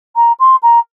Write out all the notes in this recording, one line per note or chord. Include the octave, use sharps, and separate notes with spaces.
A#5
C6
A#5